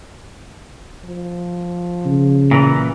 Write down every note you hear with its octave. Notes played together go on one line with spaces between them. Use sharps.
F3
C#3
A#2 E3